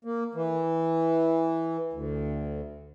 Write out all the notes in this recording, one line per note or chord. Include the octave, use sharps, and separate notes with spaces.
A#3
E3
D2